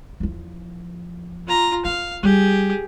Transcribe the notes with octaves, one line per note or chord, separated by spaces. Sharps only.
E2 F3
F4 A#5
F4 F5
G3 G4 G#4